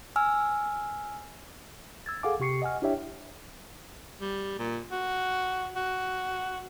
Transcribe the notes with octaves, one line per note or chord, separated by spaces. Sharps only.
G#5 E6 F6
E6 G#6 A6
G#4 A4 F5 F#5 G#5 D6
C3 G4 C#6 C7 C#7
D#5 F#5 G#5 F6
D4 E4 G4 C#5 E5 G5
G3
A#2
F#4
F#4